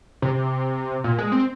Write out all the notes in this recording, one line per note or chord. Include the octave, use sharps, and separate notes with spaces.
C3
A#2
G#3
C4